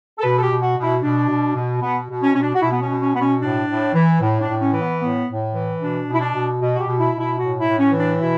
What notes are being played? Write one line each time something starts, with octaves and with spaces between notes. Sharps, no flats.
A4
B2 B4
A4
G4
B2
F#4
B2
E4
B2 D4
B2
B2
B2 B3
B2
C#4
B2 C#4
D4
F#4
B2 E4
B3
C#4
B2
C#4
B2 B3
C#4
A2 D4
A2
E3
A2
D4
A2
C#4
E3
B3
A2 B3
A2
E3
B2 D4
B2
E4
D4
B2
B2
F#4
G4
B2
E4
B2
E4
A2 F#4
E4
A2
C#4
E3
D4
B2 E4